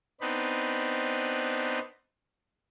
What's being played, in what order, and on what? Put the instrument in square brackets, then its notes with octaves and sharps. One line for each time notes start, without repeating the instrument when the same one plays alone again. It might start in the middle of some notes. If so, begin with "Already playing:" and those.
[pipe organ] B3 C4 D4 D#4 B4